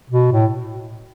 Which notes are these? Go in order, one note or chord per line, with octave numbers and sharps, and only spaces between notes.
B2
A2